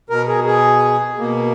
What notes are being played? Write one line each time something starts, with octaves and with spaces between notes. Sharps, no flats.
B2 A#4
G#4
G#4
B2 A#3